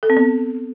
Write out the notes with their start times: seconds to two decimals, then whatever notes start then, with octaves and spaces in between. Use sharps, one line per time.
0.03 A4
0.10 C4
0.17 B3